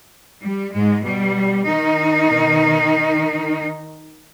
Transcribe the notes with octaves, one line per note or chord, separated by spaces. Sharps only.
G3
G#2 G#3
B2 G3
D#3 D#4
B2